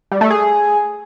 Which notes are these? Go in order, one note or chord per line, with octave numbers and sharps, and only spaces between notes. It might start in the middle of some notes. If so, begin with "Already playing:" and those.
G3
A3
G#4